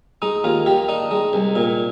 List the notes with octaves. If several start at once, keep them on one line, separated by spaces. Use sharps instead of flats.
G#3 D#4
D#2 F4
D#3 G4
D4 D#4
G#3
C2
A#2